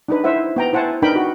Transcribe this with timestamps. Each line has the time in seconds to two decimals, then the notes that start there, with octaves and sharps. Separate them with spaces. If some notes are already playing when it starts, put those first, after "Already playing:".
0.09 D4 D#4 B4
0.24 E4 C5 E5 F#5
0.56 B3 G5 A#5
0.73 E4 C5 F#5 G#5 A5
1.02 D4 D#4 A#4 B4 G5 B5
1.16 F#4